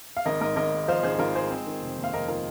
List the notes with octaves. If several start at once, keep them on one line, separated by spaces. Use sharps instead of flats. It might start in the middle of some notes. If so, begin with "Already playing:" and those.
F5
G#1 A#4 D#5
G#2 A#4 D#5
G#1 A#4 D#5
G#3
F3 C5 F5
G#1 G#4 C5
G#4
G#1 F4 A#4
G#3 G#4 C5
C4
D#3
F1
D#2
F5
F1 A#4 D#5
D#3 F4 A#4